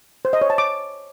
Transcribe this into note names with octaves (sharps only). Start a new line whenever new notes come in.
C5
D#5
C#5
A5
D6